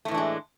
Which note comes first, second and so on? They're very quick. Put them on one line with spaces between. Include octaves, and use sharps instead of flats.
A3 A2 E3 D4 G#3